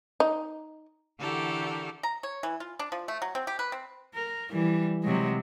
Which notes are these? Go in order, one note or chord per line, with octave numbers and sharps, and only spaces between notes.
D#4
D3 E3 F#4 G4 A4 A#4
A#5
C#5
E3
F4
D4
F3
A3
F#3
C4
G4
B4
C4
A#4
E3 G3
C3 F#3 G#3